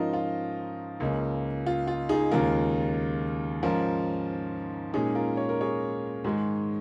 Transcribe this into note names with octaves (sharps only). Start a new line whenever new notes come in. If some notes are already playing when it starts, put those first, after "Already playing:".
Already playing: G#2 F3 C#4 D#4 F4 A#4 D#5
F4
C#2 C#3 A#3 C#4
F4
F4
D#4 G#4
D#2 C#3 G#3 F4 A#4
G#2 F3 C#4 F4 A#4
A#2 G#3 C#4 D#4 G#4
F4 A#4
C#5
A#4
G#4 C#5
G#2 D#3 G#3